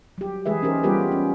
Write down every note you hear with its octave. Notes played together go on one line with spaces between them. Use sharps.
F#3 G4
E3 G#3 G#4 B4 E5
C#4 D#4 G4 A#4 C5
G3 B3 F4 G4 A#4 B4
C#4